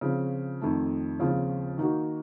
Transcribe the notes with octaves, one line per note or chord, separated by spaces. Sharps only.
C#3 F3 C4 F4
F2 D#3 A3
D#2 C#3 F3 C4 F4
D#3 A#3 D#4 F#4